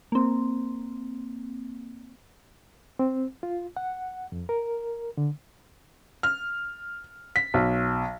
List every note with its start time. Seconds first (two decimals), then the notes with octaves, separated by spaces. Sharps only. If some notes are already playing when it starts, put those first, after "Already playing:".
0.12 A#3 C4
2.99 C4
3.43 F4
3.77 F#5
4.32 F2
4.49 A#4
5.17 D3
6.23 F6
7.36 B6
7.54 B1